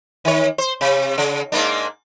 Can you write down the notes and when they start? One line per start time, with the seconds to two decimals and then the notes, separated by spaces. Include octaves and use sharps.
0.25 D#3 C#5
0.58 C5
0.81 C3
1.18 C#3
1.52 G#2 A#3 D4